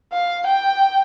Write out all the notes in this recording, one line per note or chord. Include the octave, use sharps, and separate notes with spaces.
F5
G5